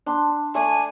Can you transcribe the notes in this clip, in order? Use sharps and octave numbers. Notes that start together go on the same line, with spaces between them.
D4 C6
A3 D5 G#5